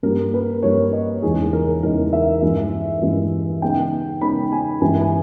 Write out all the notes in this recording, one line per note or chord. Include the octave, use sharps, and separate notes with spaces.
G2 G3 A#3 A#4
B4
G2 G3 A#3 C#5
D#5
E2 C#3 G#3 D#4 G#4
A#4
E2 C#3 G#3 D#4 A#4
E5
G2 E3 G#3
G2 E3 G#3
C#3 G#3 B3 D#4 G5
C#3 G#3 B3 D#4 B5
G#5
G2 E3 G#3 G#5
G#5